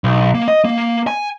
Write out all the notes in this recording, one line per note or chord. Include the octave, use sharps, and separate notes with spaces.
B1
A#3
D#5
A#3
G#5